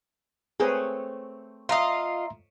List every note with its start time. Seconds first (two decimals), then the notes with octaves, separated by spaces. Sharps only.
0.60 A3 C4 G#4 B4 C#5
1.69 F4 D#5 E5 A#5 C6